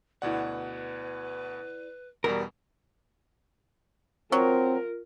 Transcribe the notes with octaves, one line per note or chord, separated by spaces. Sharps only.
D2 B2 E4 B4 D5 F#5
E2 B2 G3 A#4
F#3 C4 F4 A#4